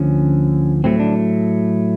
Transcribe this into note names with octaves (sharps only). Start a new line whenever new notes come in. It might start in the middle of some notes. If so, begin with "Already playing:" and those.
Already playing: D2 D3 F3 C#4
A2 F#3 A3 C4
D4